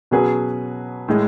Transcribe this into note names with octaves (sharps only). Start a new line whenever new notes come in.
B2 F#3 C#4 G#4 B4
A2 G#3